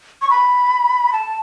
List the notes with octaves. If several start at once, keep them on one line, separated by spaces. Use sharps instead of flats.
C#6
B5
A5